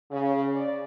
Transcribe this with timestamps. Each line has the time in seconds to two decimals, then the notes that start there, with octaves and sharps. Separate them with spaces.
0.11 C#3
0.55 D5